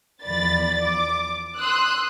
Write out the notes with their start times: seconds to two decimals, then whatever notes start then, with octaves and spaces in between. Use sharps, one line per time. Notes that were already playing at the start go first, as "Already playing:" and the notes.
0.24 E2 F3 D5 B5 A6
0.82 D6
1.56 C6 D#6 E6 F#6